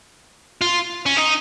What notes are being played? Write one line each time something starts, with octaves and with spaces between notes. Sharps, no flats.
F4
C#4
D#4